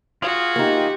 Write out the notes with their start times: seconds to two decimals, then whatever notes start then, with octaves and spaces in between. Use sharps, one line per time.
0.22 F4 F#4 G#4
0.56 A#3 D#4 G4